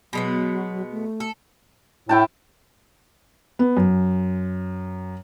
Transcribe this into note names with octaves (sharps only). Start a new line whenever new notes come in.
B2 F#3 G#3 B3
A3
A4
A2 E4 G5 A5
B3
F#2